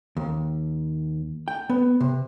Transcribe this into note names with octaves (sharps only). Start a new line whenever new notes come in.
D#2
G5
B3
C3